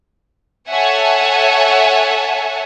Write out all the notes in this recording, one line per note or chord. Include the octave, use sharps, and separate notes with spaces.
A4 C#5 E5 F#5 G#5